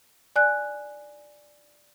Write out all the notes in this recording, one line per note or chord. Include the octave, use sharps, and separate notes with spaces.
D5 G#5 F#6